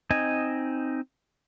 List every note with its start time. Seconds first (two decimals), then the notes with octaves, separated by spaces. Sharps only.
0.11 C4 D#4 D#5 G#5